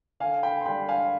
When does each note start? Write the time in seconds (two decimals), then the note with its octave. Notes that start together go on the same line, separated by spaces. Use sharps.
0.20 D3 F5 G#5
0.43 G5 B5
0.61 C6
0.66 G3 D4 G5 B5
0.88 F5 G#5